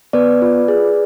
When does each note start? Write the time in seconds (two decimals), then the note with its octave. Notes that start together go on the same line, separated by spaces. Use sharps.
0.13 B3 B4 D5
0.42 F4
0.68 G#4